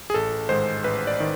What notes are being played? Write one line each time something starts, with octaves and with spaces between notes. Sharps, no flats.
G#4
A1 A4
G#2 D#3 G#3 C5
A1 B4
D5
D#3